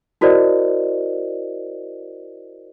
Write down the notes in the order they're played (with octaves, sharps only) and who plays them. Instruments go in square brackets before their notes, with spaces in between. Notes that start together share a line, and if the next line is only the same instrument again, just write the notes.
[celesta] E4 F#4 A#4 C5 D5 D#5